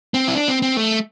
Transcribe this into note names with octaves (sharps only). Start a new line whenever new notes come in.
C4
E4
D4
C4
C4
A3